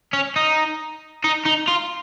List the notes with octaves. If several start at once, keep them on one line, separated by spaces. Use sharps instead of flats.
C#4
D#4
D#4
D#4
F4